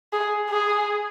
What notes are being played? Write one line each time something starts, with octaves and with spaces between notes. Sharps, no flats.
G#4
G#4